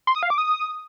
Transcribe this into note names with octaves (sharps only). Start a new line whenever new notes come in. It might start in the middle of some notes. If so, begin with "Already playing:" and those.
C6
D#6
F5
D6
D#6